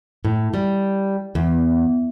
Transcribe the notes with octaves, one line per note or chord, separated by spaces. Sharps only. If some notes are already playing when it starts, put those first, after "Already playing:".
A2
G3
E2